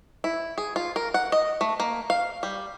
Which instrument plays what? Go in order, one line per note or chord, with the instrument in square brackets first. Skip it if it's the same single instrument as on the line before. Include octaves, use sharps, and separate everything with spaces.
[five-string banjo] E4
G#4
F4
A#4
F#5
D#5
A3
A#3
F5
G3